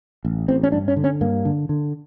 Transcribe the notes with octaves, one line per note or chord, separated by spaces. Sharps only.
A1
A1 C4
C#4
G2 D4
C#4
D3
C#4
G2 A#3
D3
D3